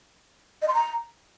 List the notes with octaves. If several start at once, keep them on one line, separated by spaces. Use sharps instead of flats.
D#5
C6
A#5